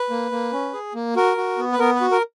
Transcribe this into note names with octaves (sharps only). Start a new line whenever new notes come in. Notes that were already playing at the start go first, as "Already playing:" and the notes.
Already playing: B4
A#3
A#3
C#4
G#4
A#3
F#4 A#4
F#4
B3
B4
B3 A#4
B4
F#4
A#4